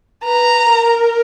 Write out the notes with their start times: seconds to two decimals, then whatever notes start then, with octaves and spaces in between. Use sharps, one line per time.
0.24 B4 A#5
0.70 A#4